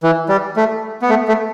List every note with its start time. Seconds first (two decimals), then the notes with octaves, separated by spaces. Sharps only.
0.03 E3
0.29 G3
0.56 A3
1.02 B3
1.09 A3
1.28 A3